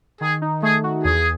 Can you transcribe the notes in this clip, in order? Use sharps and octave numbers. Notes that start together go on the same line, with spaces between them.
D#3 G#4
D#4
A3 G#4
F#4
E2 G#4